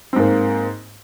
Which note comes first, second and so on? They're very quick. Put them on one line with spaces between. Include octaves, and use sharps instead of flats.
C4 G#2 A#3